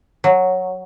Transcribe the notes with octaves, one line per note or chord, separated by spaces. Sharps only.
F#3